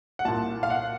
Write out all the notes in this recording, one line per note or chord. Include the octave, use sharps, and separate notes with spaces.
F#5
C2 A#2 A5
F5
F#5